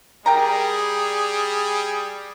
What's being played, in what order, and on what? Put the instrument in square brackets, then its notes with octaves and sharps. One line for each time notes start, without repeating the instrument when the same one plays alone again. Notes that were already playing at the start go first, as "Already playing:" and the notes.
[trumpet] G3 [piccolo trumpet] G#4 [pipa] A#4 G5 A#5